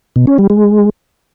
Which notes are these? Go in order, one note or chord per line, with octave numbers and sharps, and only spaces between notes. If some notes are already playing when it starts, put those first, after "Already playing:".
B2
C#4
G3
G#3